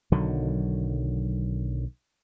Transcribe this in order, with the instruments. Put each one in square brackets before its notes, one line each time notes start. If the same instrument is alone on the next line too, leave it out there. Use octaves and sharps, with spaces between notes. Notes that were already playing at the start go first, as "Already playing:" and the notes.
[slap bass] B1 D3 D#3 F#3